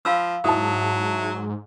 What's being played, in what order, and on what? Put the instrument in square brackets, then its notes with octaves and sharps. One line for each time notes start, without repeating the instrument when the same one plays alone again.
[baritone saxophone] F3 [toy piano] F5 B5 E6
[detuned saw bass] G#2 [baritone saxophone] F#3 [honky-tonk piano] E4 A5 [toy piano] D#6